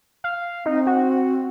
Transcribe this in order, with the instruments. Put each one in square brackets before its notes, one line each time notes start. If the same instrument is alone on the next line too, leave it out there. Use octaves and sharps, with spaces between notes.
[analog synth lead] F5
[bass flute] C4 [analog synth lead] D#4
[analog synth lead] F#4